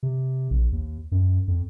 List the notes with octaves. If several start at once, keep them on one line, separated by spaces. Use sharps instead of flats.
C3
A#1
D#2
F#2
F2